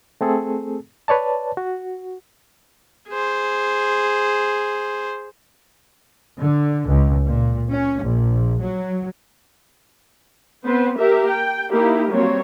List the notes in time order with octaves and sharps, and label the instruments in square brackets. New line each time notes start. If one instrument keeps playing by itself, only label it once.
[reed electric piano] A3 C4 G#4 A4
B4 C#5 D5 A5
F#4
[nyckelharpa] G#4 C5
[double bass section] D3
C#2
A#2
C#4
A#1
F#3
[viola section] B3 C4 B4 C5
A#3 G4 A#4 E5
G5
A#3 D#4 E4 G4 A#4
F#3 G3 A#3 C4 C#5